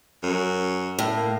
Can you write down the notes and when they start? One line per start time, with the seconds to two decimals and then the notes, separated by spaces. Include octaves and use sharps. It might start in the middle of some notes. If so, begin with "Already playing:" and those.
0.23 F#2
0.99 A2
1.16 A#3